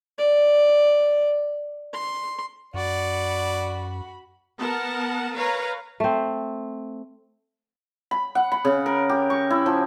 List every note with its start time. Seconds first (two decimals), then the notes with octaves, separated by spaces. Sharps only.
0.19 D5
1.94 C6
2.74 F#2 F#4 D5 B5
4.57 B3 A#4 F#5 A5
5.34 A#4 B4 C#5 F5 A#5
6.00 A3 C4
8.11 B5
8.35 F#5
8.52 B5
8.65 C#3
8.86 A#4
9.09 G4
9.30 C#6
9.50 E4
9.66 F3